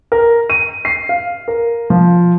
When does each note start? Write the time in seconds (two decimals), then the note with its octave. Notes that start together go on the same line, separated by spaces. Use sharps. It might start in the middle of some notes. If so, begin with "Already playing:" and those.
0.12 A#4
0.50 D#7
0.85 C7
1.09 F5
1.48 A#4
1.90 F3